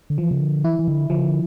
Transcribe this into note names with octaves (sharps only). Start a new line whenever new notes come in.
D3
E3 F3
C#3
D3
E3 E4
E3
D3
D3 F3
C#3
D3